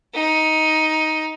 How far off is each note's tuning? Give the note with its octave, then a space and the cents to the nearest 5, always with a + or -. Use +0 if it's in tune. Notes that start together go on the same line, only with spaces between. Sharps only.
D#4 +10